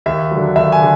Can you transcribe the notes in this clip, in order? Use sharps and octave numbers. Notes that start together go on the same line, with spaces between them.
D#2 E5
D3 F#3
D#2 E5
G#5
D3